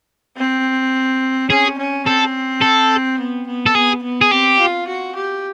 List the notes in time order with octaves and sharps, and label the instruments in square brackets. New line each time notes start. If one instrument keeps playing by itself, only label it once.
[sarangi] C4
[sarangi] C#4 [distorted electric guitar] G#4
[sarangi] C#4
[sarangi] C4 [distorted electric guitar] A4
[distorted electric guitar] A4
[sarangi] B3
B3
[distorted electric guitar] A4
[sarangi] B3 [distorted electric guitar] G#4
[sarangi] B3
[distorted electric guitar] G#4
[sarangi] C4 [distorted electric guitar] G4
[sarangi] F4
F#4
G4